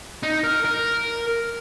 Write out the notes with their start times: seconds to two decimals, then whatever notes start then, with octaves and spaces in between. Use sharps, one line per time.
0.23 D#4
0.44 A#4
0.65 A#4